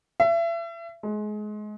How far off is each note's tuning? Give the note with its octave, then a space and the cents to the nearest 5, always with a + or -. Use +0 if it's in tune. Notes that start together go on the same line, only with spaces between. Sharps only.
E5 +35
G#3 +25